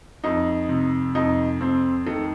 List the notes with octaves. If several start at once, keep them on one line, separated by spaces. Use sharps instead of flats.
F2 D#4
C3
F2 D#4
F2 C4
D#3 A3